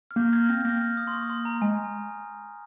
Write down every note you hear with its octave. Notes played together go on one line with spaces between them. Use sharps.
F6
A#3 G6
A#3 F6 G#6
C4 G6 A#6
A#3 G6 A#6
F6
D#6
C6
C#6
C6
A#5
G#3 G#5